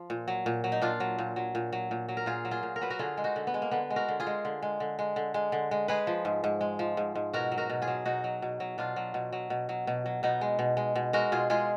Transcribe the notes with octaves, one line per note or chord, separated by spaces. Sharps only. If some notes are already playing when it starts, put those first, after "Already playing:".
Already playing: F3
A#2
F#3
A#2
F#3
D#4
A#2 D4 F4
F#3
A#2
F#3
A#2
F#3
A#2
F#3
A#4
A#2 F4 G#4
F#3
F4 G#4
A#2
A#4
F#3 B4
F#4 A#4
D3 F4 G#4
G#3
D#4 F#4
D3
B3
G#3
A#3
D3 B3
G#3
F#4 A#4
D3
F4 G#4
G#3
D3
G#3
D3
G#3
D3
G#3
D3
G#3
G#3 G#4 B4
F3
G#2
G#2
G#3
F3
G#2
G#2
B2 F#4 A#4
F#3
F#4 A#4
B2
F4 G#4
F#3
B2 D#4 F#4
F#3
B2
F#3
B2 D4 F4
F#3
B2
F#3
B2
F#3
B2
F#3
B2 B3 D#4
G#3
B2
G#3
B2
G#3 F#4 A#4
B2 F4 G#4
G#3 F4 G#4